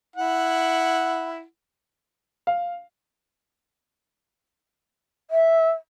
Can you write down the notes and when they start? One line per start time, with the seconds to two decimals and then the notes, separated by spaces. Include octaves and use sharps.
0.16 E4 F#5
2.47 F5
5.31 E5